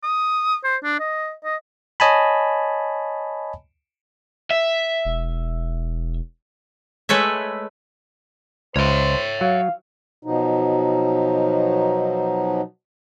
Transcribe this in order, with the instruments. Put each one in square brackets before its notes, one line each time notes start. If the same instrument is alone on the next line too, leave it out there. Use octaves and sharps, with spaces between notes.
[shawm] D#6
C5
D4
D#5
D#5
[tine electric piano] C#5 D#5 G#5 A5 B5
[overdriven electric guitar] E5
[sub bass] E1
[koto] G#3 A3 B4 C#5 E5
[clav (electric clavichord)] C#2 [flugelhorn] C5 [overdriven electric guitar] C#5 E5
[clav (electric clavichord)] F#3 [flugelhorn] F5
[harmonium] B2 F3 F#3 D#4